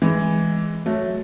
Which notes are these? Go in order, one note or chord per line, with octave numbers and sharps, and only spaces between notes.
E3 G#3
F#3 A3